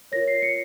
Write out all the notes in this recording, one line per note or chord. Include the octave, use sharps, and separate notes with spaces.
F4 A#4 C#5 A#6
C7
C#7